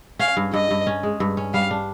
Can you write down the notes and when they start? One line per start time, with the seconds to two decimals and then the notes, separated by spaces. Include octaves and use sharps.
0.19 C#4 F5
0.37 G2
0.53 G2 D#5
0.71 G2
0.87 C#4
1.03 G#3
1.20 G2
1.37 C#4
1.54 G3 F5
1.71 D4